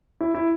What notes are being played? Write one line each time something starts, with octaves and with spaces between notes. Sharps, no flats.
E4
E4